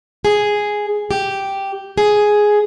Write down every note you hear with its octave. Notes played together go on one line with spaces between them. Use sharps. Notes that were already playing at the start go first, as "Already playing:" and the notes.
G#4
G4
G#4